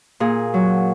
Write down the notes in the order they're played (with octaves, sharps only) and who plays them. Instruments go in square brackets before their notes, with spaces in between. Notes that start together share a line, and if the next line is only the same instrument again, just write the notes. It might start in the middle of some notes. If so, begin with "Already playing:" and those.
[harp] A#2 G#4
F#3